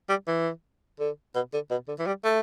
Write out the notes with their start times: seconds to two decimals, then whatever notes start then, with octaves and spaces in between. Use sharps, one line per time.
0.09 G3
0.27 E3
0.99 D3
1.35 B2
1.53 D3
1.71 B2
1.88 D3
1.99 E3
2.07 G3
2.24 A3